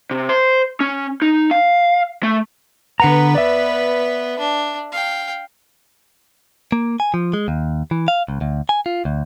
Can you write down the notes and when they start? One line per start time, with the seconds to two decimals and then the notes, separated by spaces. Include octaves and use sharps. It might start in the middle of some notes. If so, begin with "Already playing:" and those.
0.11 C3
0.29 C5
0.80 C#4
1.22 D#4
1.51 F5
2.23 A3
3.00 D3 B3 B4 F#5 A#5
3.35 D5 E5
4.39 D4
4.92 F5 G5
6.72 A#3
7.00 G#5
7.14 F3
7.33 G#3
7.48 D#2
7.91 E3
8.08 F5
8.28 C#2
8.41 D2
8.69 G#5
8.86 F4
9.05 D2